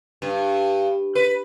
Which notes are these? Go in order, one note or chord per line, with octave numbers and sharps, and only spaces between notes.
G2
B4